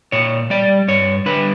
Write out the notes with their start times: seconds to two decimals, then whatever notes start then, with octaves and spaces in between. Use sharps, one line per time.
0.12 A#2 C#5
0.50 G3 D5
0.88 G2 C#5
1.26 D3 G3 B4